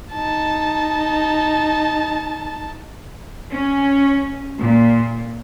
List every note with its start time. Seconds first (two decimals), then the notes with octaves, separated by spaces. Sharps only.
0.13 D#4 A5
3.50 C#4
4.59 A#2